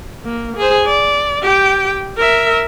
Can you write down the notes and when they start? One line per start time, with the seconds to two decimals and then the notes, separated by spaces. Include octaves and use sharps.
0.24 A#3
0.57 G#4 C5
0.86 D5
1.42 G4 G5
2.17 A#4 E5